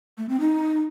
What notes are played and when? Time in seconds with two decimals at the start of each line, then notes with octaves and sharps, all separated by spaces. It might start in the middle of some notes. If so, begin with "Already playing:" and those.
0.18 A3
0.29 C4
0.40 D#4